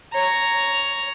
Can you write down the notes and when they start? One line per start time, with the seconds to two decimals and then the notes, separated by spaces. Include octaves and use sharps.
0.13 C#5 A#5